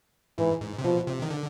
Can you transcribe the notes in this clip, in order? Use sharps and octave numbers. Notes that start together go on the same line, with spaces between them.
G#2 E3
G#2
C3
B2 F3
C3
D#3
D3